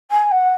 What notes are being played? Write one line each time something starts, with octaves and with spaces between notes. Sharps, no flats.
G#5
F#5